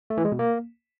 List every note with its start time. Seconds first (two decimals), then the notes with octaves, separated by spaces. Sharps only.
0.10 A3
0.17 E3
0.25 G#3
0.32 B2
0.39 A#3